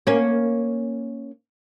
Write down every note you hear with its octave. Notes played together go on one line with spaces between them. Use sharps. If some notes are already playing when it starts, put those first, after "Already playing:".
A#3 C#4